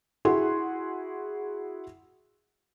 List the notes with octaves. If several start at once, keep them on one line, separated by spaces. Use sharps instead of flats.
E4 F#4 G#4 F#5 C6